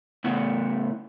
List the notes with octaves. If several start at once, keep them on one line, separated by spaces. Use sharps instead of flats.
A2 C#3 B3 E4